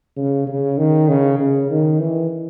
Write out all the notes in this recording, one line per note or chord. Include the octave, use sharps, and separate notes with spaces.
C#3
C#3
D#3
C#3
C#3
D#3
E3